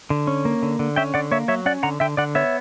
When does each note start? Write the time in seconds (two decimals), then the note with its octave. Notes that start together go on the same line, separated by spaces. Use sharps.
0.10 D3
0.27 C#4
0.45 A#3
0.63 D3
0.79 D3
0.96 C#4 E5 G5
1.14 D3 D5 F#5
1.31 A#3 C#5 E5
1.48 F#3 C#5 E5
1.66 C#4 D5 F#5
1.83 D3 F#5 A#5
2.00 D3 E5 G5
2.17 D3 D5 F#5
2.35 B3 C#5 E5